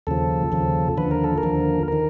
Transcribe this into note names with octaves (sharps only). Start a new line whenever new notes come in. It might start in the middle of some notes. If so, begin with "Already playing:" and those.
D#2 C#3 F3 A4
D#2 C#3 F3
D#2 D3 F3 B4
A#4
A4
A#4
D#2 D3 F3
D#3 A#4